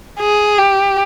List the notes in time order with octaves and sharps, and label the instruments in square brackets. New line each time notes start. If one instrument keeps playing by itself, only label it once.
[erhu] G#4
G4